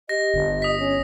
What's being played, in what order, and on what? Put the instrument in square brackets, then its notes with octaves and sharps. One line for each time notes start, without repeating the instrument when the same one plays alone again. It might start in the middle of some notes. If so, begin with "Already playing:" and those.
[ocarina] G4 [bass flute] D#5 [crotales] A#6
[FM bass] G1
[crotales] D#6 B6
[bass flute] C#4 [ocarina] C#5